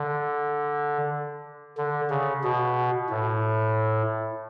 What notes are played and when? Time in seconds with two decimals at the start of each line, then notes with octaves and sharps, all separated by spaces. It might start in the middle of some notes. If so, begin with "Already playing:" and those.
Already playing: D3
1.78 D3
2.10 C#3
2.44 B2
3.10 A2